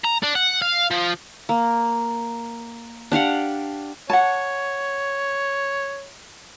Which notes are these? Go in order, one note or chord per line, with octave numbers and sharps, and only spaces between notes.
A#5
D4
F#5
F5
F3
A#3
D4 G4 F5 F#5
C#5 F#5 A5